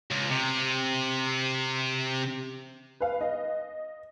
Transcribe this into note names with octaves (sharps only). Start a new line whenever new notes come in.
C#2
C3
B4 F5
D#5